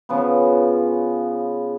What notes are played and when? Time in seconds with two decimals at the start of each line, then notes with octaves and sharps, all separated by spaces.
0.09 C#3 F3 B3